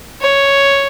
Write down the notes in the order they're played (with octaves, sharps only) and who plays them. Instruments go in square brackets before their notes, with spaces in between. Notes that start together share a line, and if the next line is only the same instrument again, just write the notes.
[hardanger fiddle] C#5